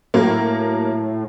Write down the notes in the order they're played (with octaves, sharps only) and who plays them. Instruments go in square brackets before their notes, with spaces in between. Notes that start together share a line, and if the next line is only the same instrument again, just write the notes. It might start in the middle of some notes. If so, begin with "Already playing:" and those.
[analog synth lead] A2 [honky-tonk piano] F#3 A#3